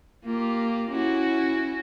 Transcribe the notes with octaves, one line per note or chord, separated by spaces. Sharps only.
A#3 F4 G4
C#4 E4 F#4